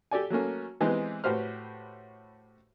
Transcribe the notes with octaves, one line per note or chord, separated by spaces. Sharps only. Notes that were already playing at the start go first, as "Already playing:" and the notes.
G4 A4 D5 G#5
F#3 A3 A#3 C#4
E3 G#3 B3 C4 D#4 G4
A2 F#4 G4 B4 C5 F6